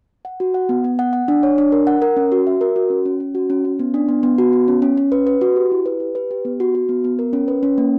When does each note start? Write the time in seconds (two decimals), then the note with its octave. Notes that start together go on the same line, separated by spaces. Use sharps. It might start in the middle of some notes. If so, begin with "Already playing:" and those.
0.25 F#5
0.40 F#4
0.54 F#5
0.69 B3
0.84 B3
0.99 F#5
1.13 F#5
1.28 D4
1.43 C#5
1.58 D4
1.72 A#4
1.87 F#5
2.02 A#4
2.17 C#4
2.32 F#4
2.47 E5
2.61 A#4
2.76 F#4
2.90 C#4
3.05 C#4
3.20 C#4
3.35 F#4
3.50 C#4
3.65 C#4
3.79 B3
3.94 D4
4.09 B3
4.23 B3
4.38 F#4
4.53 B3
4.68 C#4
4.82 C#4
4.97 C#4
5.12 B4
5.27 B4
5.41 F#4
5.56 G4
5.72 E4
5.86 B4
6.00 G4
6.15 B4
6.31 G4
6.45 B3
6.60 F#4
6.75 F#4
6.89 B3
7.04 B3
7.19 A#4
7.33 C#4
7.48 B4
7.63 C#4
7.78 A#3